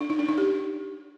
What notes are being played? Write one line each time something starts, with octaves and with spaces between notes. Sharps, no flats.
D4
D#4
D4
D#4
G4